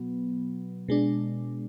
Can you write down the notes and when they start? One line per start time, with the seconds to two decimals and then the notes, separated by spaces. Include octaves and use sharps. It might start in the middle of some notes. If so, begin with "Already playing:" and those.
Already playing: B2 F#3 B3
0.88 B2 G#3 D4